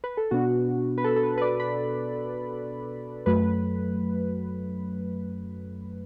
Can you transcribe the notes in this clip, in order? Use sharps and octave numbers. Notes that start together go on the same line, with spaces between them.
B4
A4
B2 B3 D4 F#4
B4
A4
A4
B4
B4
D5
B5
F#2 F#3 A3 B4